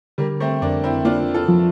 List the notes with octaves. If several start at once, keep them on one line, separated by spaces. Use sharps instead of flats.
D3 G3 A#3
A3 C4
F2 A#3 D4
C4 E4
A#3 D4 F4
F4 A4
F3